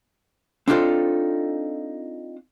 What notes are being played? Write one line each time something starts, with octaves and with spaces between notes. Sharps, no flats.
C4 D4 D#4 F4 A4 C5